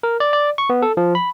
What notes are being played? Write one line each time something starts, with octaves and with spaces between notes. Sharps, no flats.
A#4
D5
D5
C#6
B3
A4
F3
B5